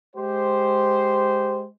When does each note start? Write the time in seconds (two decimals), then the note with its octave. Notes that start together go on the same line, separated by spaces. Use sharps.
0.15 G#3 G4 C5